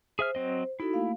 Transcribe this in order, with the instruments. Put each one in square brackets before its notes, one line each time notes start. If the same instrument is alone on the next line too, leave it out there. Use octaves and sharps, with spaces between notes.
[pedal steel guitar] G#4 E5 F6 [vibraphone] C5
[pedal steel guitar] F#3 C4 D#5
[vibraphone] D#4 F#4 A4 [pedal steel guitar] E4
[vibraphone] A3 A#3 F5